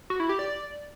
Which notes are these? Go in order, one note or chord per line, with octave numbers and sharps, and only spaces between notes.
F#4
E4
G4
D5